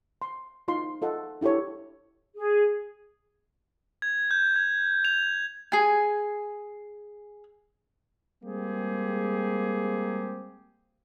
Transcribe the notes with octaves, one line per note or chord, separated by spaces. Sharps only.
C6
D#4 F4 D#5 C6
F4 A4 D#5 F#5
D4 E4 G4 A4 C#5
G#4
G#6
G6
G#6
F7
G#4 G#5
G3 G#3 A#3 C4 G4 G#4